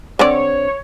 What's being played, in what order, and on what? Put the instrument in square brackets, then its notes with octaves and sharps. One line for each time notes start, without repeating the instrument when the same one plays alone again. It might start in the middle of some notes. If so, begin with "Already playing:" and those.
[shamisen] D3 C4 D5 [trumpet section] C#5